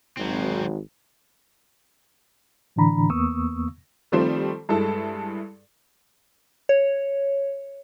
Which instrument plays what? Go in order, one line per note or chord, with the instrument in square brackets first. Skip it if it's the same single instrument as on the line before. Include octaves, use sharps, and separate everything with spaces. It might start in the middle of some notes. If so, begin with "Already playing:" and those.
[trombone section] G#1 [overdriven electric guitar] F#3 C4
[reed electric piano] A2 D3 E3 D4 A#5 B5
E2 A#3 B3 C#6 D#6 E6
[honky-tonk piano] D#3 F3 G3 A3 C4 C5
G2 G#3 E4 A4 A5
[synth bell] C#5